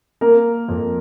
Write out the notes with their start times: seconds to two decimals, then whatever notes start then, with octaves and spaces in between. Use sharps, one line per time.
0.21 A#3 A#4
0.69 F2